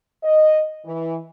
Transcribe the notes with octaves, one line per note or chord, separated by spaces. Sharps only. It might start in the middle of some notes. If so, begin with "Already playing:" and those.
D#5
E3